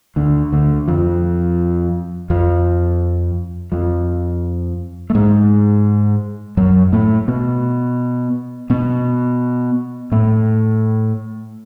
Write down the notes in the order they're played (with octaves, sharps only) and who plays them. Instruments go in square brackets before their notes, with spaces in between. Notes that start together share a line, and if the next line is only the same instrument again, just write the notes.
[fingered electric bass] D2 D3
D2 D3
F2 F3
F2 F3
F2 F3
A3
G#2 G#3
F#2 F#3
A2 A3
B2 B3
B2 B3
A2 A3